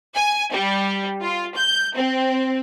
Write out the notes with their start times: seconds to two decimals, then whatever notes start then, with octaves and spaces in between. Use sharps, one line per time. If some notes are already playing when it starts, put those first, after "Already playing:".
0.15 G#5
0.51 G3
1.23 F4
1.56 G6
1.96 C4